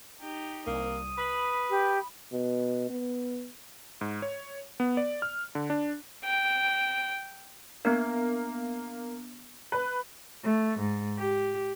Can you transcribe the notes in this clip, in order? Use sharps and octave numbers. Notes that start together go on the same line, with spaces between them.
D#4 G4
C2 A#3 D#6
B4 B5
G4
B2
B3
G#2
C#5
B3
D5
F6
D3
D4
G5
A#3 B3 D4
B4
A3
G#2
G4